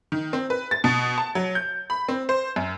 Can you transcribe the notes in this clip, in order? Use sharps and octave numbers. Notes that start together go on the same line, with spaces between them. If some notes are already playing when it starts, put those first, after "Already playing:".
D#3
C4
B4
A6
B2
A5
F#3
G6
B5
C4
C5
F#2